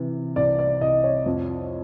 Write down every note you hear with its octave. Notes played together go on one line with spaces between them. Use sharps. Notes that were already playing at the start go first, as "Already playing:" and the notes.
Already playing: C3 E3
C2 D5
D5
C2 D#5
C#5
F2